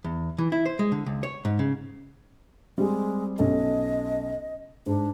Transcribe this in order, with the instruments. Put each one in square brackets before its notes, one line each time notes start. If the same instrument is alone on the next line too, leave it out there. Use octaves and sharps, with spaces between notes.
[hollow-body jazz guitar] E2
E3
E4
C5
G#3
D3
C#2
C#5
G#2
C#3
[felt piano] G3 C4 [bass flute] G#3
[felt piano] B1 C#4 A4 [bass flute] D#5
[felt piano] G#2 [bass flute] D4